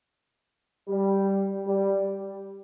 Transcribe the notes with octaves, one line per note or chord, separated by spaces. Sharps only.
G3
G3